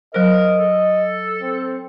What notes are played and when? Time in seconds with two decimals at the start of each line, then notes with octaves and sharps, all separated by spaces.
0.14 F#3 A#4 C5 D#5
0.59 A4
1.42 C4